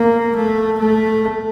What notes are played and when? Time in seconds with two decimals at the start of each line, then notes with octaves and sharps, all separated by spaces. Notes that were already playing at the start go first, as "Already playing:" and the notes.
Already playing: A#3
0.36 A3
0.79 A3